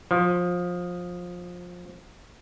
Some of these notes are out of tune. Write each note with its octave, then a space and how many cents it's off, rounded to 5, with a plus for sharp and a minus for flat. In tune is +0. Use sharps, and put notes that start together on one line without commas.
F3 +20